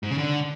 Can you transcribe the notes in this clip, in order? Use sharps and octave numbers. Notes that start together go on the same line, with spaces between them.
G#2
C#3
D3